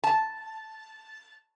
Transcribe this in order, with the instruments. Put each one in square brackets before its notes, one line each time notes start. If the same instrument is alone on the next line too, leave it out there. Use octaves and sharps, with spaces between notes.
[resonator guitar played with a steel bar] A5